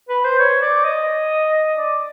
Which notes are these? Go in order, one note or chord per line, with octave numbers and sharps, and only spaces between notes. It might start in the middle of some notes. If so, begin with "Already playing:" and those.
B4
C5
C#5
D5
D#5
D5